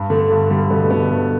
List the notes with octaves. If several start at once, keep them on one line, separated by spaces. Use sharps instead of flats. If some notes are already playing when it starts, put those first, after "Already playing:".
Already playing: G2
D3 A3
G2
D3 G3
B2 D3 B3
A3
B2 D3 B3
G2 A3